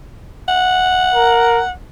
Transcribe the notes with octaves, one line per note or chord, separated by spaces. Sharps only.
F#5
A#4